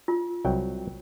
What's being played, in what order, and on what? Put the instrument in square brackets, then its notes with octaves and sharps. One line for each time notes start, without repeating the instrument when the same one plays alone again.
[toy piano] F4
[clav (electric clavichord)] C2 F#3 G5